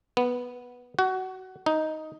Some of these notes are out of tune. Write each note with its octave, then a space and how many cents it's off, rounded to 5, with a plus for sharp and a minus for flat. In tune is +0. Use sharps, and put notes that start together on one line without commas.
B3 -5
F#4 +20
D#4 +5